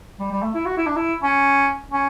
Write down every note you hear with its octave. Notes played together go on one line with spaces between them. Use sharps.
G3
G3
A3
E4
F#4
E4
D4
E4
C#4
C#4